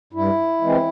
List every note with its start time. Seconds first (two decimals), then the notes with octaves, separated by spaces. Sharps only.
0.13 G2 E4
0.61 E3 G#3 C4